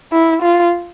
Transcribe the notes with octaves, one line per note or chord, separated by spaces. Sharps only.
E4
F4